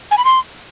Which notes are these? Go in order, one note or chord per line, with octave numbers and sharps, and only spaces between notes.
G#5
B5
C6